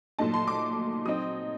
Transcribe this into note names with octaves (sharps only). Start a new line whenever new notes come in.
A#2 F#3 A3 D#4 A5
C6
D6
F#3 C4 D#4 D#6